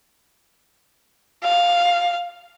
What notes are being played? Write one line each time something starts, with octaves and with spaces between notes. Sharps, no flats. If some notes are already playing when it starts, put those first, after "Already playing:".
F5